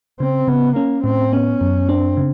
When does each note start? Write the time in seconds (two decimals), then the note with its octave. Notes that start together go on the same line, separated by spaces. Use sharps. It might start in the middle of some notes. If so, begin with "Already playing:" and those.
0.20 C#3 C4
0.47 C#3 B3
0.76 A#3 C#4
1.04 A2 C4
1.33 B3 C#4
1.61 F#2
1.89 C4 D4
2.17 C#3